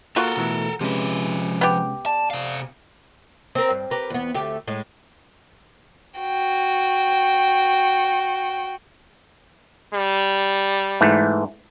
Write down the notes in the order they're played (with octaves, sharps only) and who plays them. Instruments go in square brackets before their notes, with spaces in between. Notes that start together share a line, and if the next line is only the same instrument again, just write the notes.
[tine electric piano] A#3 [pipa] F4 F#4 [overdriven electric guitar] A4 A#4
[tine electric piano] B2 E3 A3
[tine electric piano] C3 G#3 C#4 [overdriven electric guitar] F3 B4
[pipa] B3 G4
[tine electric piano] D5 [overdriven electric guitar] A5
[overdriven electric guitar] C3 F5
[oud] C4 A#4
G2
G4 A#4 B4
E2 B3
D2 A3 G4
A2 G#3
[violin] F#4 G5
[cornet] G3
[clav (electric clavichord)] G#2 E3 A3